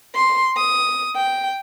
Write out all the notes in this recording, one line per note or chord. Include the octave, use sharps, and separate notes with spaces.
C6
D#6
G5